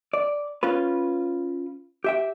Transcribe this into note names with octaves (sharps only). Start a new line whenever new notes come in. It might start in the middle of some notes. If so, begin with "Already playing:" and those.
D5
C#4 F4 B4
G4 E5 G5